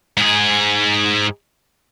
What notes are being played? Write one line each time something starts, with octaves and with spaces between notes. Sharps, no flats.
G#2 G#4